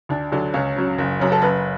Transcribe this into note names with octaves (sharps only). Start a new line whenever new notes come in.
D2 D4
D3 F#3
C#2 C#4
C#3 F#3
F#1
F#2 C#3
A4
F#1 B4